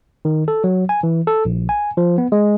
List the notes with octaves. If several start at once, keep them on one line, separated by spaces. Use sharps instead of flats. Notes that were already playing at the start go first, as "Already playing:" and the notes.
D#3
A4
F#3
G#5
E3
A4
A#1
G#5
F3
B3
G#3